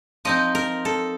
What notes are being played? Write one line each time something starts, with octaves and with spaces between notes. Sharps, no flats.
F3 C4 D#4 D#5
A#4
A4